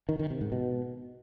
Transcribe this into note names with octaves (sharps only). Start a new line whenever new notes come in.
D#3
D#3
C3
G#2
B2